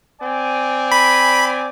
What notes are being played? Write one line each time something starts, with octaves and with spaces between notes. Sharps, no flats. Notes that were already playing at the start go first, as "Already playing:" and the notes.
C4 D5 G#5
B5